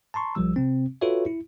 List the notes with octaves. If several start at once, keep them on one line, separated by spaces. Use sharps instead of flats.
A5 A#5 C6 C#6
B1 F3 G3 E6
C3 C4
F4 F#4 A4 B4 C#5 E5
E4